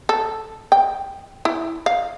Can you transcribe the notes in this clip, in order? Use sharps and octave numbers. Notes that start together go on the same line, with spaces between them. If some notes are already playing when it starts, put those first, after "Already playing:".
A4
G5
E4
F5